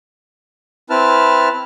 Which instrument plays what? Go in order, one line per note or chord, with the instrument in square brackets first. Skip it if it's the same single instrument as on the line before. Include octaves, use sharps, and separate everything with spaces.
[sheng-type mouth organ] C4 E4 B4 A5 F6